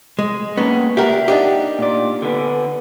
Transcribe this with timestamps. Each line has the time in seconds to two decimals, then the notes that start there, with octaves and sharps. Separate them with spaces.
0.19 G#3
0.58 A#3 B3 C#4
0.97 G4 A#4 E5 F#5
1.28 D4 D#4 G4
1.79 A#2 D5
2.22 D3 B3